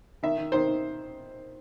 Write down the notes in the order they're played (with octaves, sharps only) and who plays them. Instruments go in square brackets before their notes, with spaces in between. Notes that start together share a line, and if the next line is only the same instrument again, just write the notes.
[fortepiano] D#3 E5
D#3
D#3 C5
D#3